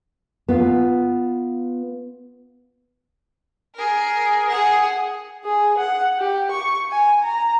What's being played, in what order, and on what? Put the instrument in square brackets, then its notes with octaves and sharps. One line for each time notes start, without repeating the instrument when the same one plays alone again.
[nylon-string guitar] B3 F4
[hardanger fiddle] G#4 A#4
G#4 F#5
[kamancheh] G#4
F#5
G4
C#6
G#5
A#5